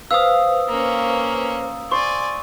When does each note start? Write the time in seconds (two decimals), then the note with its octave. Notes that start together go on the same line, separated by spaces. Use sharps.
0.11 B4 C5 F5 D#6 E6
0.69 A#3 C#4
1.92 C5 D5 G#5 C#6